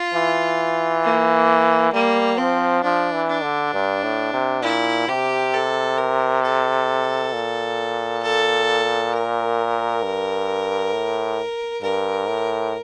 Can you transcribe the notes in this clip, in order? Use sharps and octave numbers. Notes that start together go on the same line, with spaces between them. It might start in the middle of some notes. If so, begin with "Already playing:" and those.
Already playing: F4
E3
A#3
G3 A#3
F3 C4
F3 D4
E3
D4
D3
G2
A2
C3
A#2 E4
C3 G4
A4
A#4
A4
A#2
A4
A#4
G2
A2
G2 A#4
A2